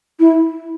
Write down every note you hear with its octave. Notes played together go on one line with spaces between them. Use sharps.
E4